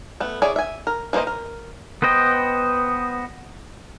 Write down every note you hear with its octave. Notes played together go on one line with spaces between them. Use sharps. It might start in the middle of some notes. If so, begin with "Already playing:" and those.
A3 B3
E4 G#4 C#5 D5
E5 G#5
A#4
E3 A#3 G#4 C5 D#5
A#4
B3 B4 C5 D#5 G5